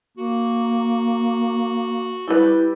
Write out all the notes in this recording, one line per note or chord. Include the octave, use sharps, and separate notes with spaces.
A#3 F#4
G3 E4 G4 B4